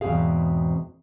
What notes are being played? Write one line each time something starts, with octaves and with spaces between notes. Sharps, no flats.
E2 G#2 B2 C4 G#4 F5